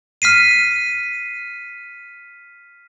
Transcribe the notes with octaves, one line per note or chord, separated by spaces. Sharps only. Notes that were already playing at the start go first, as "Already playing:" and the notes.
F6 B6 C7 D#7